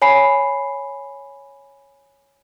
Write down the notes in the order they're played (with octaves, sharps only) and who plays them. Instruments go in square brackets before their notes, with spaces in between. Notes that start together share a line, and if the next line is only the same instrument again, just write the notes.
[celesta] C#5 G#5 B5 C7